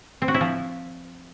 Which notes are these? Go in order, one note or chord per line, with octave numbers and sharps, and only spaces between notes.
C4
F#4
E4
F3